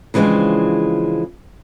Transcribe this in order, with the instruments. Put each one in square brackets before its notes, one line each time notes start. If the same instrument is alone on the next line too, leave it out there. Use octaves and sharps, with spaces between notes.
[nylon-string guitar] C#3 E3 F3 G#3 C4 D4